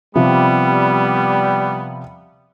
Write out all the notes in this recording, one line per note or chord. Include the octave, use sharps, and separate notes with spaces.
C3 F3 G3 B3